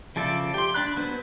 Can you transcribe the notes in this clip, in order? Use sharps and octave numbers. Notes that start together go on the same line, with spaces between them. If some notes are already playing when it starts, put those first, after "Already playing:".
C#3 F3 A4 D5 E5
G4 C6
D4 D5 B5 F#6
F#3 B3 B4 C5